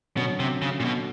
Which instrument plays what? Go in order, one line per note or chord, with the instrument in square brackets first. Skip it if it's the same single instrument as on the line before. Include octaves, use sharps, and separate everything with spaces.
[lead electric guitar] B2 [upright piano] D3 F#3 A3 C#4
[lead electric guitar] C3
C#3
A#2
B2